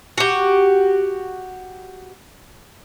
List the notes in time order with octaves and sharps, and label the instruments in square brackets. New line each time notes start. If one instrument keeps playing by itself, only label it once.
[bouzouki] F#4 G4